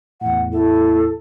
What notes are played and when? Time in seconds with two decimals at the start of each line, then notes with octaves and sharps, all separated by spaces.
0.21 E2 A2 F#5
0.53 E4 A4